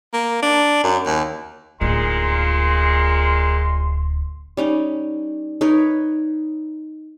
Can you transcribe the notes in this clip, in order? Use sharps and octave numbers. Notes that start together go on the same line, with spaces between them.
A#3
D4
F#2
D#2
D1 A#2 G#3 D#4 C6
G3 C#4 D#4
D#4 A#4 B4 C#5